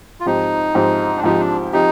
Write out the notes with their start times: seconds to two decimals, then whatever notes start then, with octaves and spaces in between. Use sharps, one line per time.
0.20 F4
0.26 G#2 F3 C4 D#4 G4
0.75 G#2 F3 C4 G4
1.17 D4
1.23 G#2 F3 C4 D#4 G4
1.40 D4
1.73 F3 C4 D#4 G4